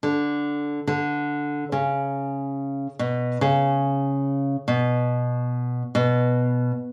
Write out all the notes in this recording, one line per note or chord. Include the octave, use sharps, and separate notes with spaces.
D3
D3
C#3
B2
C#3
B2
B2